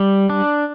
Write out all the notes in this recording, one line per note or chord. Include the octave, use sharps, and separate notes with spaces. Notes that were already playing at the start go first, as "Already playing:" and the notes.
Already playing: G3
D4